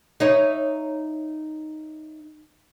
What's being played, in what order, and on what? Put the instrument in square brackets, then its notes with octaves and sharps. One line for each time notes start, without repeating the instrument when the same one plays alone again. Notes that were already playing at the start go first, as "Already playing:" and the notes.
[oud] D#4 E4 C#5